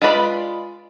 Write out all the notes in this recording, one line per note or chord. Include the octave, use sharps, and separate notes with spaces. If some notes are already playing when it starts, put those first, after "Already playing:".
G#3 F4 B4 D5 B5